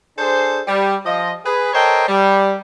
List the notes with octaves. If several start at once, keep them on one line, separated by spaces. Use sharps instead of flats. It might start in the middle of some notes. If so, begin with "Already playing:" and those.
D4 G#4 A4 C5
G3
F3 D#5
G#4 B4
A4 A#4 C5 C#5 D#5 G5
G3